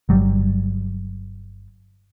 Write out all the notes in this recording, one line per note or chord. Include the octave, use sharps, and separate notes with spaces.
G1 F#3 G3